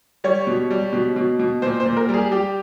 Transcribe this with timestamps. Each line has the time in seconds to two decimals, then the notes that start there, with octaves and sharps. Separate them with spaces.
0.24 G3 C#5
0.47 B2
0.71 G3
0.93 B2
1.16 B2
1.39 B2
1.62 A#2 C5
1.80 C5
1.85 A#2
1.97 A#4
2.09 G3 G#4
2.31 G3 G4